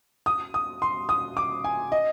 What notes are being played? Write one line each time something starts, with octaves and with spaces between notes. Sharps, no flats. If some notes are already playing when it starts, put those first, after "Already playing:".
D#6
D#6
C6
D#6
D6
G#5
D#5